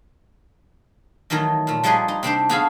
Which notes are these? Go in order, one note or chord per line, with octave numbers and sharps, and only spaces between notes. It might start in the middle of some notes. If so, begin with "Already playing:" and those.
D#3 E3 F#3 A3 D#4
A#2 A3
F3 G3 D#4 G#4 B4
D#4
C3 C4 D4 C5
B3 F#4 G#4 A4 F5 B5